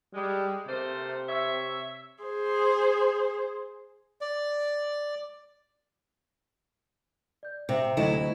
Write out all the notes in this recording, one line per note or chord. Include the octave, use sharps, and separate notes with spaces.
G3 G#3
C3 A3 A#3 C5
C#5 E5
G#4 C5
D5
D5 G6
C3 C5 E5 A#5
D2 F#3 E4 A4 D#5 E7